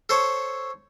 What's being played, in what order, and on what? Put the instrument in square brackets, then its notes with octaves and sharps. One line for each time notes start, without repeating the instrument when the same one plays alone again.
[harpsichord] A4 C5 C#5